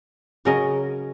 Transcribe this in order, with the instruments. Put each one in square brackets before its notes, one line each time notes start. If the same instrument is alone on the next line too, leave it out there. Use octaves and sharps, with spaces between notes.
[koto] C#3 F#3 C#4 A#4 D#5